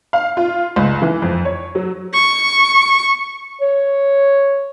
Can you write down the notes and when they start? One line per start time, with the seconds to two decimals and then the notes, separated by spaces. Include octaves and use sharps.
0.13 F5
0.37 F4
0.76 C#2
1.02 E3
1.22 F2
1.45 C#5
1.75 F#3
2.13 C#6
3.61 C#5